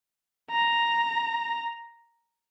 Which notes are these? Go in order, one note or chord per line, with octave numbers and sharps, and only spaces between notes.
A#5